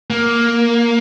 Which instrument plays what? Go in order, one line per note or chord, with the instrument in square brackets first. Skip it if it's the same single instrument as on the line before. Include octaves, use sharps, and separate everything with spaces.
[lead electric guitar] A#3